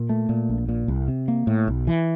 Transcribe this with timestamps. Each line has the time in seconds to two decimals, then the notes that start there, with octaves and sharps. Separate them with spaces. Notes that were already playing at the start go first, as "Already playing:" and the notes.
Already playing: A#2
0.09 A3
0.29 A#2
0.49 A#1
0.69 A#2
0.88 C2
1.08 C3
1.28 A#3
1.47 A2
1.68 B1
1.87 E3